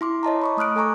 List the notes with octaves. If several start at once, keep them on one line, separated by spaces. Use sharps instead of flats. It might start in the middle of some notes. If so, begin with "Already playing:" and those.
E4 C6 D6
C#5 D#5 A5 A#5
B5 C#6 D6
A3 D#6 F6 F#6 D7
A4 G#5 A#5 C#6 D6